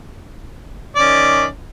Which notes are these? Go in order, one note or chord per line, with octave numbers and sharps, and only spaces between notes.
D#3 C#4 D5